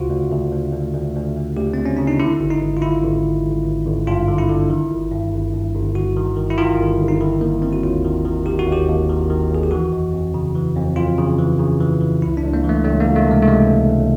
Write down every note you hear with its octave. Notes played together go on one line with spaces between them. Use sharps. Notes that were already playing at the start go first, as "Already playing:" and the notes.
Already playing: D2 C#3 F4 F#4
D2
D2
D2
D2
D2
D2
D2
D2 G4
D2 C4
C#4
C#3 D4
D#4
D3 E4
G#1
D#4
G#1
F4
D3 E4
G#1
D3
G#1
G#1
G#1
G2 F4
D3
E4
D3
D#3
G1
G2
G1
G2
G1
G1 F#4
D#3
D#3
E4
D#3 F4
G1
G1
D#4
D#3 E4
D#3 A#3
D#3 C4
F#4
D#2 F4
D#3
D#3
D#3 G4
F#4
D#2
G4
D#2
D#3
D#3
D#2 G#4
G4
E3 F#4
F2
F2
C#3
E3
F2
F2 F4
C#3
E3
C#3
E3
E3
C#2 E4
D4
C#2
A#3
E3
A3
C#2 A3
A#3
C#2
A3
C3 G#3
A3
C3 G#3
C#2
C#2